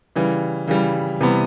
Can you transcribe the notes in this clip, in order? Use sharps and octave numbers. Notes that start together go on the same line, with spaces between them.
C#3 E3 G3
C#3 E3 G3
C3 E3 G3 B3